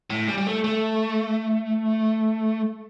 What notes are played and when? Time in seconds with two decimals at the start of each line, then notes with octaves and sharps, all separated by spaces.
0.10 A2
0.28 G3
0.38 G3
0.47 A3
0.64 A3